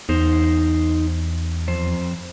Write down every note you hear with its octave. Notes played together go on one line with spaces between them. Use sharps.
E2 D#4 C5
F2 C5